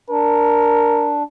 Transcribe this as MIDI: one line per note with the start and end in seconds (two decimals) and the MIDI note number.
0.10 1.23 62
0.10 1.16 70